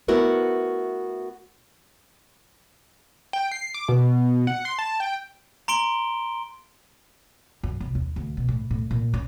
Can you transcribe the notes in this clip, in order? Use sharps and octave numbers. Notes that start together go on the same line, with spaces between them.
A3 B3 E4 F#4 A#4 B4
G5
C7
D6
B2
F#5
C6
A5
G5
A#5 C6 D7 G7
F#2
C2
D#2
D2
B2
A2
A2
A#2
C#4